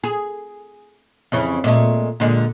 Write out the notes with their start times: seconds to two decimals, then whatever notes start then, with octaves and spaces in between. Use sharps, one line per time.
0.04 G#4
1.32 F2 C#3 E3
1.64 A#2 G#3 A3
2.20 A#2 D3 G#3